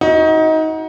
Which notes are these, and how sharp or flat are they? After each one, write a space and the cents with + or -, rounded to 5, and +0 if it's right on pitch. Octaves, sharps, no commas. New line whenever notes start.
D#4 +25 F#4 +0